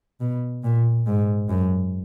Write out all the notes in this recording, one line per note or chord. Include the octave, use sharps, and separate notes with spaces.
B2
A#2
G#2
F#2